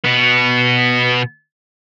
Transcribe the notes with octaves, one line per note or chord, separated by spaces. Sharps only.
B2 B3